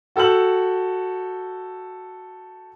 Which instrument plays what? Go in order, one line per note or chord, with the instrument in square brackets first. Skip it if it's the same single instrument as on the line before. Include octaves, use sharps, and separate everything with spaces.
[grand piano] F#4 A4 G5 E6 F#7